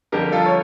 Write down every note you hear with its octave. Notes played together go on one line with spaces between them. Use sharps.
F2 D3 G3 G4 A#4
F4 A4
C#5